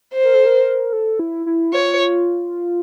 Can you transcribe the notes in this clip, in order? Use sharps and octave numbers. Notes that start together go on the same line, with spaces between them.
C5
A#4
A4
A#4
A4
E4
E4
F4 C#5